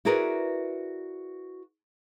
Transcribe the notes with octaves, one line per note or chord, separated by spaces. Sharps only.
E4 F#4 G#4 A#4 B4 D5